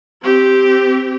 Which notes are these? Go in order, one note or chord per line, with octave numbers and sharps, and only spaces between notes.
C4 G4